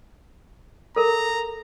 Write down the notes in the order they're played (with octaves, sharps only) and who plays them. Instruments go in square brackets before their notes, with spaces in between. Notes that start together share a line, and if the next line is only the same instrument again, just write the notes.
[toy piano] A4 A#4 [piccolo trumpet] A#5